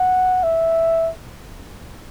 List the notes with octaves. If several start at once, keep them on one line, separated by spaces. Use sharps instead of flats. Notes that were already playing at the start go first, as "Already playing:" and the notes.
Already playing: F#5
E5